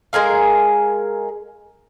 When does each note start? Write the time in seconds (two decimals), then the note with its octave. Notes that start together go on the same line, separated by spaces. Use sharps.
0.13 G#3 G#4 A#4 F5